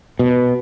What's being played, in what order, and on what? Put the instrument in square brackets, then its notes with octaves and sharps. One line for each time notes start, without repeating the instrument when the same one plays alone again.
[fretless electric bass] B2